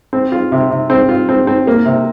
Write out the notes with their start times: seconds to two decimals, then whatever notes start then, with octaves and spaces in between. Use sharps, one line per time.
0.13 C4
0.32 F4
0.52 C3
0.70 C3
0.90 C4
1.09 F4
1.29 C4
1.47 C4
1.67 A#3
1.85 C3